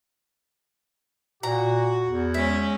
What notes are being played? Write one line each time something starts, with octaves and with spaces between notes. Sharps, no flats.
A#2 F#4 A#5
E2
G#3 C#4 E5